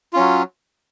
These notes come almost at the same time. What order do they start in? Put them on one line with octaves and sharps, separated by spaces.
F4 C#4 F#3